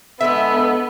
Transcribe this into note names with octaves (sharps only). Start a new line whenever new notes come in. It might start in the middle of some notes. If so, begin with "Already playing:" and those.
D3 G#3 B3 E5 E6